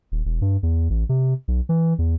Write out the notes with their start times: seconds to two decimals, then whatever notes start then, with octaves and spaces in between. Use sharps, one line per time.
0.12 D#1
0.25 E1
0.42 G2
0.63 E2
0.90 A1
1.09 C3
1.48 B1
1.69 E3
1.99 E2